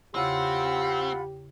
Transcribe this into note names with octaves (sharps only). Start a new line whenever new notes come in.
E2 C#3 C4 F4 G4 F#5 B5 E6